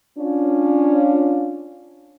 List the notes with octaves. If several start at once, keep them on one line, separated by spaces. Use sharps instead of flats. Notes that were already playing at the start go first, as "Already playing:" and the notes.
C#4 D4 F4